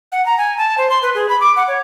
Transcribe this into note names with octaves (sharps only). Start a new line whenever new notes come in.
F#5
A#5
G#5
A5
C5
C6
B4
G#4
B5
D6
F#5
C#5